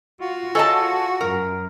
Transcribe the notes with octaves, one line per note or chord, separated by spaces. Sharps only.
F4 F#4
F4 G#4 A4 C#5 D#5 A5
F#2 A#4